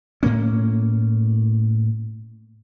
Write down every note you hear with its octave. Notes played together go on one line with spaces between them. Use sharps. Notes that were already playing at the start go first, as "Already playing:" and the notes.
A2 A#3 C#4